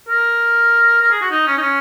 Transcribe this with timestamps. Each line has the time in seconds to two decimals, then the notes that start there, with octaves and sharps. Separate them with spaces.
0.09 A#4
1.01 A#4
1.11 G#4
1.21 F#4
1.31 D#4
1.47 C#4
1.57 D#4
1.61 C#4